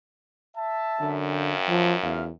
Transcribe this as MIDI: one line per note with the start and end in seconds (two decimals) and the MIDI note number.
0.56 1.15 76
0.56 1.15 81
1.00 2.31 42
1.00 1.53 50
1.30 1.74 77
1.30 1.74 79
1.69 1.94 53
2.02 2.30 40
2.02 2.25 65
2.02 2.25 76
2.02 2.25 77